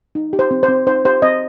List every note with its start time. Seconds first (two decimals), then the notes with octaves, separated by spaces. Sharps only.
0.15 D#4
0.33 G4
0.39 C5
0.51 C4
0.63 C5
0.69 C4
0.87 D#4 C5
1.05 G4 C5
1.22 C4 D#5